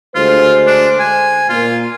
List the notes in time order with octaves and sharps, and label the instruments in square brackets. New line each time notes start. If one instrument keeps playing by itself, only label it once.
[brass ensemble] D2 G#3 C5 [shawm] F4
[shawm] D4
G#5
[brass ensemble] A#2 [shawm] F4